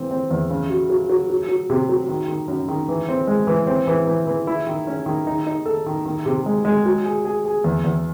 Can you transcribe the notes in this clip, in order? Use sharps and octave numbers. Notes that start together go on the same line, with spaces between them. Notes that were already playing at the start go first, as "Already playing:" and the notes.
Already playing: E3 C4
C4
E2
C#3
F#4
F#3
F#3
F#3
F#3
C3
F#3
D#3
D#3
F#2
D#3
E3
C4
G#3
E3
C4
E3
E3
E3
E4
D#3
C#4
D#3
D#4
D#4
A4
D#3
D#3
C3
G#3
G#3
F#3
G#4
G#4
G#4
E2
E2